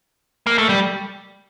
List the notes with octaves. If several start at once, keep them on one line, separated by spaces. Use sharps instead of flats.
A#3
A3
G3